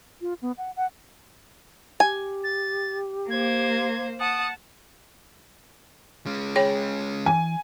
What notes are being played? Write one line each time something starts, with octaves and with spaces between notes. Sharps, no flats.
F4
B3
F#5
F#5
G4 G#5
A6
A#3 C5 G#6
F#5 A5 D#6
G#3 C#4
G#4 C#5 G5 B5
E3 G#5